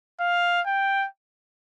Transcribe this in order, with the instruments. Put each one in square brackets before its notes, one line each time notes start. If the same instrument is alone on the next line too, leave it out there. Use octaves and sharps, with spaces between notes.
[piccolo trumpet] F5
G5